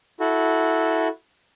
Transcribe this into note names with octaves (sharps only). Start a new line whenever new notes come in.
E4 F#4 A4